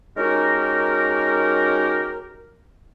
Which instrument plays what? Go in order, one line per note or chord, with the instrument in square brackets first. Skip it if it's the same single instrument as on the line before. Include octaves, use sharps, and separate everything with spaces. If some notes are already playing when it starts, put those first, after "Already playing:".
[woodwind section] G#3 C#4 D#4 F#4 G4 A#4